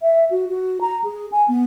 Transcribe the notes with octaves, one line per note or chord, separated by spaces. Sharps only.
E5
F#4
F#4
A#5
G#4
G#5
B3